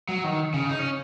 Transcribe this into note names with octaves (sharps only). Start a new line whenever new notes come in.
F#3
D#3
C#3
D#4
C#4